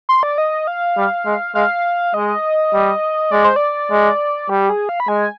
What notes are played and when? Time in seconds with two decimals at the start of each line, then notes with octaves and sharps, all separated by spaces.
0.09 C6
0.23 D5
0.38 D#5
0.67 F5
0.97 G3
1.26 G#3
1.55 G#3 F5
2.14 G#3 D#5
2.74 G3
3.31 G#3 D5
3.44 C5
3.56 D5
3.91 G#3
4.49 G3 G4
4.69 G#4
4.89 F5
5.00 B5
5.08 G#3 G#5